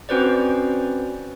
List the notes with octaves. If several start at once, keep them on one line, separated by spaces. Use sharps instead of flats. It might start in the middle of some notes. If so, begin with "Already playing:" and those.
C4 C#4 F#4 B4 C5 D5